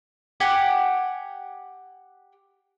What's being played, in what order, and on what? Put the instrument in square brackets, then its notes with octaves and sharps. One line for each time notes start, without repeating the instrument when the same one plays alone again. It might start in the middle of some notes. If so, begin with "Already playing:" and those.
[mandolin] G4 F#5 G#5